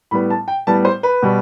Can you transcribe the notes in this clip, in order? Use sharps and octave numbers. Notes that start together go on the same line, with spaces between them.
A2 G3 B3 B5
A5
G5
A2 G3 B3 A5
C5
B4
B2 G3